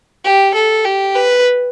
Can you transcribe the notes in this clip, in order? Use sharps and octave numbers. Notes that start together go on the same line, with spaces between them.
G4
A4
G4
B4